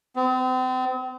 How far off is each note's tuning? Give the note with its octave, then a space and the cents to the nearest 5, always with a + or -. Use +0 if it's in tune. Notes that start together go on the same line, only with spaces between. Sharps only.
C4 -40